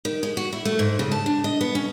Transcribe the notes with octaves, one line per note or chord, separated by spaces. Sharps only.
D#3
G#3
F#4
E4
A3
G#2
C#3
A5
D4
D#5
B3
C#4